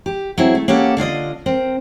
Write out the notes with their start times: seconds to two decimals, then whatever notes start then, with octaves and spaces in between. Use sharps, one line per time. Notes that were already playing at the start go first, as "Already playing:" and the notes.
0.06 G4
0.38 F#3 C4 E4 G#4
0.55 A3
0.68 A#3 C#4 G4 A4 F#5
0.97 D3 D4 F4 D#5
1.46 C4 A#4